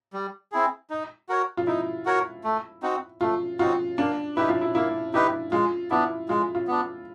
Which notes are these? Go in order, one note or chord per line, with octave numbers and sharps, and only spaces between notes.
G3
C4 E4 G#4
D#4
F#4 A#4 C#5
F4
D#4 E4
F#4 A#4 C#5
A3
C4 D#4 F#4
A3 F4
C4 D#4 F4 F#4
A#3 D4
D#4 E4 G4 B4
F4
E4
A#3 E4
D#4 E4 G4 B4
G#3 F4
B3 D4 E4
G#3 F4
F4
B3 D4